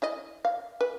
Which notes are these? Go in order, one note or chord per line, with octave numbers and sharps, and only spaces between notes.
E4 D5 D#5
F5
B4